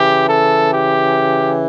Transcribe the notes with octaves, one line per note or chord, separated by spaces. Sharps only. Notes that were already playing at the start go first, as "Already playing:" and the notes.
Already playing: C#3 E3 G4
A4
G4